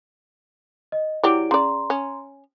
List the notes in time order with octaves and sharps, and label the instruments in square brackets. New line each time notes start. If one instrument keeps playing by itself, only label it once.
[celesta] D#5
[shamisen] F#3 G4 D5 [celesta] E4 D7
[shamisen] C#3 D5 [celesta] A#5 C6
[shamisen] C#4